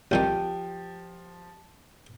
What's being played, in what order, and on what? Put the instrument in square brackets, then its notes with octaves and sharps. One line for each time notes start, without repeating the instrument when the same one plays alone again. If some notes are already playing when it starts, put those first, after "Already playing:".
[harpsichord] C2 D#3 D#4 [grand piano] F3 [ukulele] G4